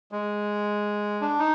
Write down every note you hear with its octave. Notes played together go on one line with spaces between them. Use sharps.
G#3
D4
D#4